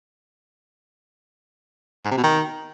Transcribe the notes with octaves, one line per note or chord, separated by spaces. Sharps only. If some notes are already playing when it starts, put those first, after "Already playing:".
G#2
C3
B2
D#3